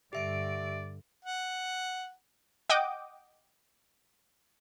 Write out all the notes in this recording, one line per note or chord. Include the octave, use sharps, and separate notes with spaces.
G2 D3 G4 D5 E5 D7
F#5
D#5 F#5 G5 D6 D#6